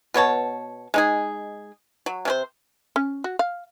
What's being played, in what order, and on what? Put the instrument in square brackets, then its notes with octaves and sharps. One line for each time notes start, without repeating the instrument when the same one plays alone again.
[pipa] B2 B3 C#5 A5
G#3 D#4 G#4
F#3
C3 C#4 C5
[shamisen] C#4
F#4
F5